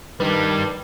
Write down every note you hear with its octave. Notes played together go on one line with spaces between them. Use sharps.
D#3 G3 D4 B4